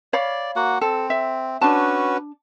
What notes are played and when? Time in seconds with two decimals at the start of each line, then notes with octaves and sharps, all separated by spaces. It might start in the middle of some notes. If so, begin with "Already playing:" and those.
0.13 C#5 D5 F5 B5
0.56 A#3 F#4 F#5
0.81 C4 A4
1.10 E5
1.61 C#4 D4 F#4 B4 A5